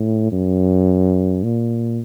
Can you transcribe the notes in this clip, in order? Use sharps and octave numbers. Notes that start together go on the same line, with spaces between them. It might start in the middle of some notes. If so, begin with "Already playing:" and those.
Already playing: A2
F#2
A#2